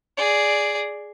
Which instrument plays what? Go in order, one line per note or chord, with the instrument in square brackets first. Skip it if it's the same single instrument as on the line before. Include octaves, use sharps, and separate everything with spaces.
[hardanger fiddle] G#4 D5